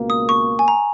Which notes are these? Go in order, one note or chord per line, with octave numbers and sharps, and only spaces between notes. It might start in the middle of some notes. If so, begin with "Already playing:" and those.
Already playing: C#2 B2 A#3
D#6
C#6
G#5
A#5